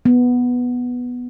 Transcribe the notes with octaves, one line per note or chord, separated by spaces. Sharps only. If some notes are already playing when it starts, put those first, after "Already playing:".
B3